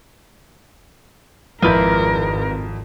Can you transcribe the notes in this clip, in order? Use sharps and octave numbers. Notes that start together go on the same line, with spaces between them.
G#1 F2 E4 F4 A#4 B4 D5 G6